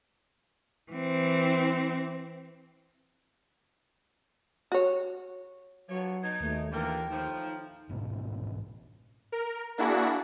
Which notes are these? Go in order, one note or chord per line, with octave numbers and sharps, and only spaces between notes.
E3 C4
F#4 C#5
G2 F3 F#3 C#5
B2 D#4 G#6
D#2 A3
D3 E3 F4 A#4 G5
A2 F3 D#4
A1 G#2 B2
A#4
A#3 D4 E4 F#4 G#4